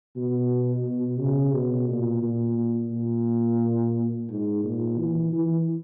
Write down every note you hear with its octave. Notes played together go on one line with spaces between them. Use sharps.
B2
B2
C#3
B2
A#2
A#2
A#2
G#2
A#2
E3
E3